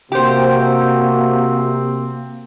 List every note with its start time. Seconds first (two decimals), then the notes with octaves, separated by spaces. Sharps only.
0.12 C3 A#3 C4 F#4 G4 C5